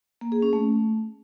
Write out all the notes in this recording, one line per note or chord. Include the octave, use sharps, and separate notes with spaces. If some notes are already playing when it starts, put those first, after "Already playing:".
A#3
G#4
C#4
A3